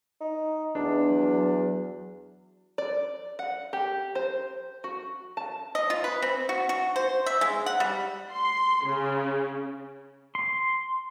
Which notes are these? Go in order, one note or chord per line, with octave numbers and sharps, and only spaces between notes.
D#4
E2 D4
F#3
D5
F#5
G4
C5
F#4
A5
D#5
F4
B4
C4
F#4
F#4
C5
E5
G#3
F#5
G3
C6
C#3
C6